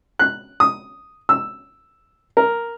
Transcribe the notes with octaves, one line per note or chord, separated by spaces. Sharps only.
F#6
D#6
E6
A#4